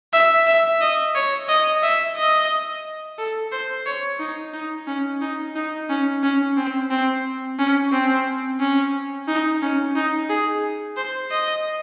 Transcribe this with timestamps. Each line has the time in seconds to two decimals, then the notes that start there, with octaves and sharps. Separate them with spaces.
0.13 E5
0.47 E5
0.81 D#5
1.15 C#5
1.49 D#5
1.83 E5
2.17 D#5
3.18 A4
3.52 C5
3.86 C#5
4.20 D#4
4.54 D#4
4.87 C#4
5.21 D#4
5.55 D#4
5.89 C#4
6.23 C#4
6.57 C4
6.91 C4
7.59 C#4
7.92 C4
8.60 C#4
9.28 D#4
9.62 C#4
9.96 D#4
10.29 G#4
10.97 C5
11.31 D#5